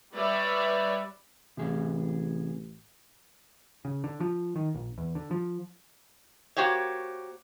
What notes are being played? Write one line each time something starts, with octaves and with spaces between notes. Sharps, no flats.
G3 B4 C#5 D5 E5
A1 C3 E3 G#4
C#3
D3
F3
D#3
A#1
E2
D3
F3
A#3 F#4 G4 C5 C#5